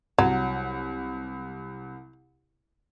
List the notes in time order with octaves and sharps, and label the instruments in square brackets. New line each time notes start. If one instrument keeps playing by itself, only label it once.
[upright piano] C2 [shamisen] F#3